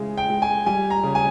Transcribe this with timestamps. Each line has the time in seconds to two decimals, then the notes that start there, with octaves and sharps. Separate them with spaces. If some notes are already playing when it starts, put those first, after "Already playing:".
Already playing: C#3 E3 G#3
0.18 G5
0.30 G#3
0.42 G#5
0.66 G3 G#5
0.90 A#5
1.04 C#3
1.15 G#5